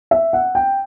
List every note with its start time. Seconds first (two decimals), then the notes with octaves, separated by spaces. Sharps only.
0.11 E5
0.33 F#5
0.55 G5